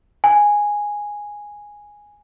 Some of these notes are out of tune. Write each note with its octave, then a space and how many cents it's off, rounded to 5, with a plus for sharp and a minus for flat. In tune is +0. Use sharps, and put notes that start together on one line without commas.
G#5 -5